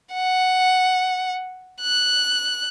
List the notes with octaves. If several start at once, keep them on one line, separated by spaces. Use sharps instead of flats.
F#5
F#6